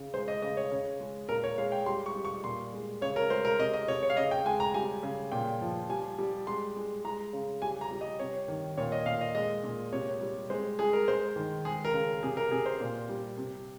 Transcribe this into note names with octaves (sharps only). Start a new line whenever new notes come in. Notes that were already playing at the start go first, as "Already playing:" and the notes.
Already playing: C#3
G#3 C5
D#5
C#3 D#5
C#5
C#3
G#3
A#2 A#4
C#5
G#3 F5
G5
G3 C6
C#6
G3
C#6
A#2 C6
G#3
C#3 C#5
A#4
G#3 C5
A#4
C3 D#5
D#5
C3 C#5
C#5
F5
C#3 D#5
G5
G#3 G#5
A#5
G3 G#5
C#3
A#2 G5
F3
G3 G#5
G3
G#3 C6
G#3
G#3 A#5
C#3
G3 G#5
A#5
G3
D#5
C3 C#5
D#3
A#2 C#5
D#5
A#2 F5
D#5
G#3 D#5
A#2
C3 C#5
G3
G#3 C5
G#3 G#4
A#4
G#3 C5
D#3
G#3 G#4
A#4
C#3
C3 G#4
A#4
C3 G#4
C5
A#2
G3
C3